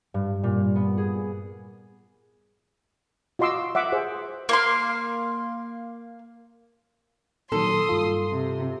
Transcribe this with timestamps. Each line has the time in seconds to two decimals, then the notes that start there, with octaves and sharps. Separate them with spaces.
0.14 G2
0.43 A#2
0.75 B3
0.98 G#4
3.39 F4 F#4 D#5 C6 D6 E6
3.75 E5 F#5 D6
3.92 G#4 C5 E5
4.49 A#3 F5 C6
7.52 A#2 D#3 F#3 A4 C6 D#6
7.89 G2 F4
8.32 C3